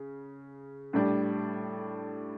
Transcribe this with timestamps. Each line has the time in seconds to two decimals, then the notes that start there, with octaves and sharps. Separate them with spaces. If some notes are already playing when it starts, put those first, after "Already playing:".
Already playing: C#3
0.93 A2 G3 D4